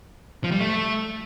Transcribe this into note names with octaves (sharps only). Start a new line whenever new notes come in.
F3
G3
A3